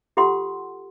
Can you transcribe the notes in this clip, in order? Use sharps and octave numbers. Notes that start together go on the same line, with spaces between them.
F4 G4 A4 F#5 C6